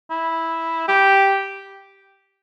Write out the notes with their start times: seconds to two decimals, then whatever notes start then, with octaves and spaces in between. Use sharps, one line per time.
0.11 E4
0.88 G4